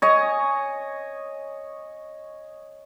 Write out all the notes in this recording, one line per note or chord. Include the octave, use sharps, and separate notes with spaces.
C#5 D#5 G#5